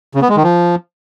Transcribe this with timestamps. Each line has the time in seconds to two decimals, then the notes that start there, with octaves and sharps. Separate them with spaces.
0.15 C#3
0.22 B3
0.29 G#3
0.36 D#3
0.43 F3